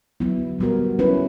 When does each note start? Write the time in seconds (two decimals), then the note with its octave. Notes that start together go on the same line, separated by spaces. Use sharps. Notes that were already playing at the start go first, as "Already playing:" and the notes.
0.20 D3 F#3 B3 E4
0.59 A#2 G3 B3 F#4 A#4
0.99 F#3 C#4 E4 B4